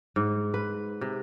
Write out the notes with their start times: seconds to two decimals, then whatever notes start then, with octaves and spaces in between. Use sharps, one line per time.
0.16 G#2
0.54 B4
1.01 C3